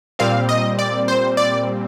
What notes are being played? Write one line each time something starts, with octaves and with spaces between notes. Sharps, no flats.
A#2 G3 C4 F5
D#5
D5
C5
D5